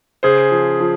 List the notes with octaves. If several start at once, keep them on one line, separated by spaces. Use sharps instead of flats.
C#3 G#4 C5
F3
F3